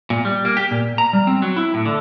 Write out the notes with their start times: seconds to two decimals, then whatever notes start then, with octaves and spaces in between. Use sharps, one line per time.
0.10 A#2
0.25 G3
0.45 A#3
0.57 G4
0.71 A#2
0.98 A#5
1.13 G3
1.27 C4
1.42 F#3
1.56 E4
1.74 A2
1.85 D3